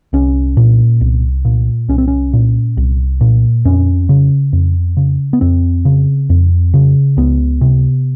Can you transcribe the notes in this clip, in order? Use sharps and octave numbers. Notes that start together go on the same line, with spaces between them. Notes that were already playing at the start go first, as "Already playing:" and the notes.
C2 C#4
A#2
C2
A#2
C2 C#4
C4
C#4
A#2
C2
A#2
F2 C#4
C#3
F2
C#3
B3
F2 C4
C#3
F2
C#3
C#2 B3
C3